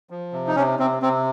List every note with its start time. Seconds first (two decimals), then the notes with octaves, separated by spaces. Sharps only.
0.10 F3
0.33 C3
0.48 D#4
0.56 C3 C#4
0.79 C3 C4
1.02 C3 C4